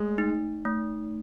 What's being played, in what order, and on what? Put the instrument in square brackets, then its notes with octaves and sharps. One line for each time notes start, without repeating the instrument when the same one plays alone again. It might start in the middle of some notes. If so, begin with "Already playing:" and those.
Already playing: [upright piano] G#3 [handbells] A3
[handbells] D#4
A3